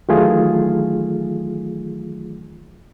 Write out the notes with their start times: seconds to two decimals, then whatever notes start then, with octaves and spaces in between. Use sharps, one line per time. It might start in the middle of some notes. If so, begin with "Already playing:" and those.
0.09 D#3 E3 F#3 A3 F4 G#4